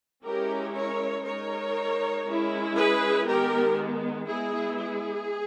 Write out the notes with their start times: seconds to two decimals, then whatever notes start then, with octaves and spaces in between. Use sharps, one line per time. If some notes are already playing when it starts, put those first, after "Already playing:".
0.24 G#3 C#4 E4 G4 A#4
0.74 A#4 C#5
1.25 G#3 D#4 A#4 C#5
2.26 G#3 C#4 E4
2.76 G#4 B4
3.26 D#3 G#3 B3 G4 A#4
4.27 G#3 B3 E4 G#4
4.78 G#4